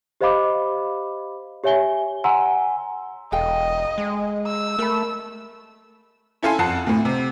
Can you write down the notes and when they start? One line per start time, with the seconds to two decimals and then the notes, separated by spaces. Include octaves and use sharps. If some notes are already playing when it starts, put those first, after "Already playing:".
0.21 G4 C5 D#5 F5 B5 D6
1.64 G4 C#5 E5 G#5 G7
2.24 F#5 G#5 A#5 C6 E6
3.32 E1 A4 D#5 F5 G5
3.98 G#3
4.47 E6
4.79 A3 A#4 B5
6.43 C#4 E4 A4 F5 G#5 C6
6.59 F2 F#5 A5 C7
6.87 D2 A2
7.05 C3 C4